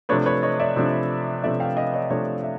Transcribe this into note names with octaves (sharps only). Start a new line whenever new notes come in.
C3 F3 A3 D4 B4 C#5
B4 C#5
C#5 D#5
D5 E5
C3 F3 A3 D4
C3 F3 A3 D4 D5 E5
F5 G5
D#5 F5
C#5 D#5
C3 F3 A3 D4 C#5 D#5
E5